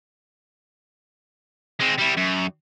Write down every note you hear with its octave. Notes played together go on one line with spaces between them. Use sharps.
G#3 C4
G3 E4
F#2